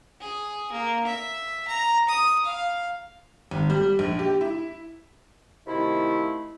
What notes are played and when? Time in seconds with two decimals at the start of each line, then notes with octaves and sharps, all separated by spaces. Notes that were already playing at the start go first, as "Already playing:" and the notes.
0.21 G#4
0.72 A#3
1.07 E5
1.68 A#5
2.09 D#6
2.45 F5
3.51 G#1
3.70 G3
3.99 A#1
4.19 G4
4.41 E4
5.67 C3 D#3 F3 A3 E4